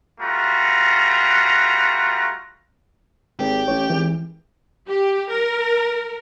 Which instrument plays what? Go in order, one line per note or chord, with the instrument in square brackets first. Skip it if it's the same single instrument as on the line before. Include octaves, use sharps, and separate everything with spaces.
[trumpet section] G3 A3 F4 F#4 A#5
[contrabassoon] G#1 [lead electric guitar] G4
[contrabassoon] A1 [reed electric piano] C#5
[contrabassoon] G#1 [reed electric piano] E3
[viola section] G4
A#4